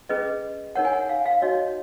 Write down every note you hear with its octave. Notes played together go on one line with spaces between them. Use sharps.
C#4 G#4 B4 D#5
D#4 A#4 C#5 F#5
G#5
F#5
F5
F5
D#4 F#4 C#5 D#5